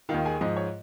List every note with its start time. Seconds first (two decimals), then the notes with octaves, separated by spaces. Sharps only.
0.09 D#2 D#3 F4 F5
0.25 G#4 G#5
0.41 G#2 F3 D#5
0.56 C#5